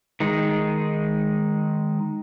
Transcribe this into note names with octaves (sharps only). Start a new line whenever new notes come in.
D#3 G#3 D#4